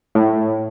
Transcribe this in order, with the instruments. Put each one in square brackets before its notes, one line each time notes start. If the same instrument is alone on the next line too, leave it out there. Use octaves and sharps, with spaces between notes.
[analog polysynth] A2